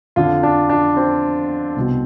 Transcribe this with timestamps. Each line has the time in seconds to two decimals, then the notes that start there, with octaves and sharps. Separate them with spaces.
0.16 F2 D3 F3 F4
0.43 D4
0.70 D4
0.97 C4
1.76 C2 B2